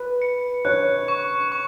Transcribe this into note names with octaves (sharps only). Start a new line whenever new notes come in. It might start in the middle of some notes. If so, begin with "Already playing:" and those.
Already playing: B4
C#7
C#5 F#6
C#6
C#6